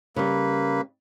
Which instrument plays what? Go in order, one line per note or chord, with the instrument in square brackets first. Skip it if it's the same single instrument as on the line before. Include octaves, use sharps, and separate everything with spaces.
[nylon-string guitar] C#3 G3 [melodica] A#3 B4